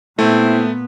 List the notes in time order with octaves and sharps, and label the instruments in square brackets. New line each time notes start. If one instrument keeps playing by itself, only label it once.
[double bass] A#2 B3 [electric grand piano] A3 [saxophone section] C4 E4